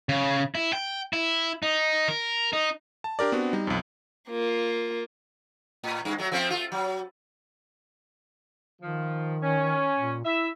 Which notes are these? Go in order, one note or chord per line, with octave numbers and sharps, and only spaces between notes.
C#3
E4
G5
E4
D#4
A#4
D#4
A5
D4 G4 A#4 D5
B3 C4 D4 F#4
G3 D#4
B1 F2
A#3 F4
A2
G2 G#3
F#3 A3
F3 A3 C4
A3 F4
F#3
D#3 F3
C#4
A#2
E4 E5